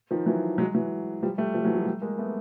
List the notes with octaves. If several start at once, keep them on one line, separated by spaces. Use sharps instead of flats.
D#3 F3
E3 F#3
F#3 G#3
E3 F#3
F3 G3
G3 A3
F3 G3
E3 F#3
F3 G3
G3 A3
G#3 A#3
A3 B3